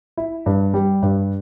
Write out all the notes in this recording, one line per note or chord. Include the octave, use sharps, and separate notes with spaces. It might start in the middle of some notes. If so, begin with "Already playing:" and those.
E4
G2
G3
G2